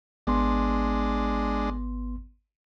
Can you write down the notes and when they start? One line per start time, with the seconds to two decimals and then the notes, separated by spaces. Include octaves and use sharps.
0.27 G#1 G#3 B3 D4 C6